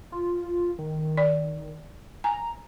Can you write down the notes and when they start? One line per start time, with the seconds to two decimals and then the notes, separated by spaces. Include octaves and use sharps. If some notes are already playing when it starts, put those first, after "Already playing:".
0.12 F4
0.79 D#3
1.17 D5
2.24 G#5 A#5